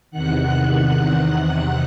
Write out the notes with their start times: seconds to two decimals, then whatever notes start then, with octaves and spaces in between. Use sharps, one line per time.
0.11 E2 C3 D#3 F#5 F#6
1.05 F#5 F#6